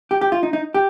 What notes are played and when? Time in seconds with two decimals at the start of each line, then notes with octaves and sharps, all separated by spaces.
0.11 G4
0.21 G4
0.32 F4
0.43 D#4
0.53 D#4
0.74 G4